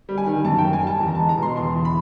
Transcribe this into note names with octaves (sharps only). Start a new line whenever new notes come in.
G3
G#5
D#3
F#2 A5
G5
A#3
G#5
G3 A5
E2
A#5
A5
G#3
A#5
B2 C6
E2 C6
E2
B5